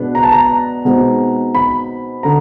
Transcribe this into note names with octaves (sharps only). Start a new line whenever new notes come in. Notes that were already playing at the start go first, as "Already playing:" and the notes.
Already playing: B2 G#3 B3 D4
A#5
A5
A#5
B2 G#3 C4 D#4
B5
D3 A#5